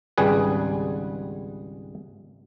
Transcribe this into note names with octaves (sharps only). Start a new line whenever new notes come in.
G#1 C#2 G3 G#4 B4